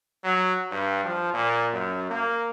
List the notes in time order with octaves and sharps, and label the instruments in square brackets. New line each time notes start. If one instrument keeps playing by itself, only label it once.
[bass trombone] F#3
G2
F3
A#2
F#2
A#3